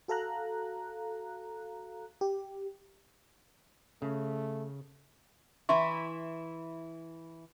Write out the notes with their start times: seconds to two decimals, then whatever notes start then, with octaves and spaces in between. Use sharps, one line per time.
0.08 F#4 A4 F5 A#5 F#6
2.21 G4
4.02 C#3 A3
5.69 E3 E4 E5 C6 C#6